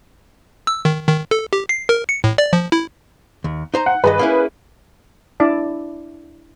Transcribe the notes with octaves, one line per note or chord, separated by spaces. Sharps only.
E6
D#3
D#3
A4
G4
C7
A#4
C#7
A2
D5
F3
E4
D#2
D#4 C5 A#5
F#5
G2 D#3 G#4 B4 D#5
A#3 C#4 E4
D4 E4 D5 A5